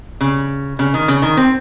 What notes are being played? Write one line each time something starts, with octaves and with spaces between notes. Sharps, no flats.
C#3
C#3
D#3
C#3
D#3
C4